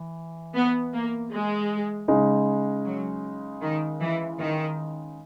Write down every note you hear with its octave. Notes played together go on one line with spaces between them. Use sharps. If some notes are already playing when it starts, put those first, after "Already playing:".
Already playing: E3
B3
A#3
G#3
C#3 G#3 D#4
F#3
D#3
E3
D#3